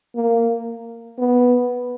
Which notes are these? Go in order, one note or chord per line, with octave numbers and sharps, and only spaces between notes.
A#3
B3